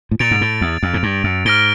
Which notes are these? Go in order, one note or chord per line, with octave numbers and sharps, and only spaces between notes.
A2
A#2 A6 D7 F7
G#2
A2
E2
F2
G#2
G2
F#2
G#2 F6 A#6 D7 G7